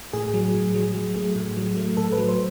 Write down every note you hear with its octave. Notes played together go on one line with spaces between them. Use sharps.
A2 G#4
F#3
A2
F#3
F#3
A3
A2
F#3
A3
A2 A4
B4
F#3
C5